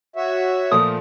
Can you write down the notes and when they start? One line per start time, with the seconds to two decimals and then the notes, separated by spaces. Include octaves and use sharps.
0.16 F#4 C#5 E5
0.72 A#2 F3 A3 D#6